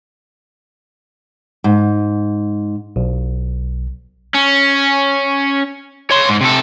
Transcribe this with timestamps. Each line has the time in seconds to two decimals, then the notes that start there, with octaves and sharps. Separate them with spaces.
1.64 G#2
2.96 B1
4.34 C#4
6.11 C#5 C6
6.29 G#2
6.41 C3 A4